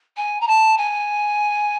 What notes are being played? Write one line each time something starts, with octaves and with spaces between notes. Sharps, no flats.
G#5
A#5
A5
G#5